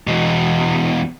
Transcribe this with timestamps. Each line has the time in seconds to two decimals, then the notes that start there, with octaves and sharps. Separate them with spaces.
0.07 E2 B2